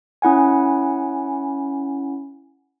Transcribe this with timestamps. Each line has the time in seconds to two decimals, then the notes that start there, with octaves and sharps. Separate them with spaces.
0.22 C#4 E4 F#5 G#5